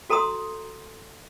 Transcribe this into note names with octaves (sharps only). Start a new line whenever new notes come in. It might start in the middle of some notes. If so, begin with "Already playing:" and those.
F#4 A4 A#5 C6 D#6